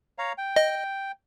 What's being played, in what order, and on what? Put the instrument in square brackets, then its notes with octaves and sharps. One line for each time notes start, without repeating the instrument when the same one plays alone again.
[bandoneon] C#5 F5 A#5
G5
[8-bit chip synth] D#5